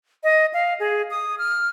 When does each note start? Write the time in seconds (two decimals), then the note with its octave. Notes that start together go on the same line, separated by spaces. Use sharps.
0.24 D#5
0.54 F5
0.80 G#4
1.10 D#6
1.38 F6